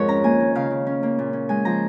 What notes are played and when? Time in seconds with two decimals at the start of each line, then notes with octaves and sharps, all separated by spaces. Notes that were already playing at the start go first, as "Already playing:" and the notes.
Already playing: F2 G#2 G#3 A#4 C#5
0.08 C#4 A#5
0.24 A#3 G#5
0.40 D#3
0.55 C#3 F5
0.71 C#3
0.87 C#4
1.03 A#3
1.19 A#2
1.33 C#4
1.49 G#3 G#5
1.65 F3 A#5